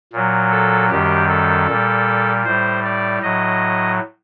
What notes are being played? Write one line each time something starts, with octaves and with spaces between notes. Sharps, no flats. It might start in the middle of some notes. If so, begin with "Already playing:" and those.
A#2 F#3
A4
F#2 D#3 G3 G4
A4
A#2 G3
A2 G3 C5
D5
A2 F#3 D#5